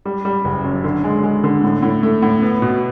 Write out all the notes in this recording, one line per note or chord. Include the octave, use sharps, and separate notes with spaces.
G3
G3
F#1
F#2
D3
G#3
G#3
D3
A2
A2
A3
A2
B3
B2